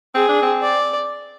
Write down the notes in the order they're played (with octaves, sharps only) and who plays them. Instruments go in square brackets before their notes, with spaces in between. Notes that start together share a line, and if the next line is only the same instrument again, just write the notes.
[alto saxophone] C4 [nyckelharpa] G#4
[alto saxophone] D4
C4
[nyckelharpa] D5